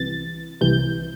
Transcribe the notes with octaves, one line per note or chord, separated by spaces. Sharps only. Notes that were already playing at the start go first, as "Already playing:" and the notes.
Already playing: C2 C3 E3 A6
C2 C3 E3 G6